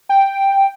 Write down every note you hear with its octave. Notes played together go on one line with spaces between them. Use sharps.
G5